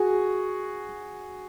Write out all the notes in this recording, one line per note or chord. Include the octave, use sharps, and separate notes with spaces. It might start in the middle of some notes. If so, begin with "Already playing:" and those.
Already playing: F#4 G#4